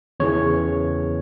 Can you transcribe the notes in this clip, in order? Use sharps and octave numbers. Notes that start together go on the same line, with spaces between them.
E2 C#3 E3 C#5